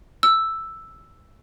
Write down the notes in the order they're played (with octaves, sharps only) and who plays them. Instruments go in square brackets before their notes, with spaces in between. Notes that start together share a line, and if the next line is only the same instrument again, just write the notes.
[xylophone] E6